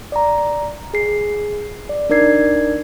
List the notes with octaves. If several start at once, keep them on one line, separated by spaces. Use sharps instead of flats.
D5 A#5
G#4 C7
D5
D4 D#4 A#4 D5 G#6 C7